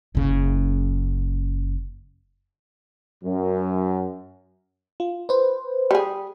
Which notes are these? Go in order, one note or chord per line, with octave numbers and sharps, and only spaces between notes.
F#1 C#3
F#2
F4
B4 C5
G3 G#4